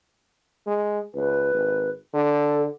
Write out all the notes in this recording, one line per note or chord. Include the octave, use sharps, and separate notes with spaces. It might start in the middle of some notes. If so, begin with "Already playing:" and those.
G#3
C#2 B4
G#1
D3 A4